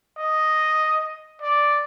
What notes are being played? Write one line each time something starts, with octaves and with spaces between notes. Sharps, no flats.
D#5
D5